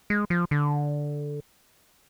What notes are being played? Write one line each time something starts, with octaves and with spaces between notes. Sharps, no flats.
G#3
F3
D3